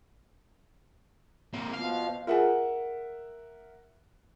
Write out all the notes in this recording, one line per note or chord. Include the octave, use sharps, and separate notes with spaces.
A#3 C4
B2 F3 F5
F4 G#4 A#4 E5 F#5 G#5